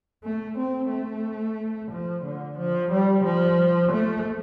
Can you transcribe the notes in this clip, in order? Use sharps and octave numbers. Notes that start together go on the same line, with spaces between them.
A3
C4
A3
F3
D3
F3
G3
F3
A3